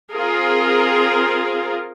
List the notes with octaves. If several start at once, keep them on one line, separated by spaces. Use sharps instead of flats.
C4 F4 G#4 A#4